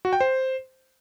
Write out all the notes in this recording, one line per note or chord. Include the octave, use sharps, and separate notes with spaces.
F#4
G5
C5